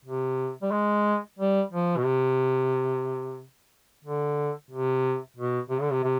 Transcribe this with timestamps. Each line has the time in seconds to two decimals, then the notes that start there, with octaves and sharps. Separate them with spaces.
0.05 C3
0.62 G3
0.71 G#3
1.39 G3
1.72 F3
1.97 B2
2.05 C3
4.05 D3
4.71 C3
5.37 B2
5.70 C3
5.81 D3
5.92 C3
6.04 C3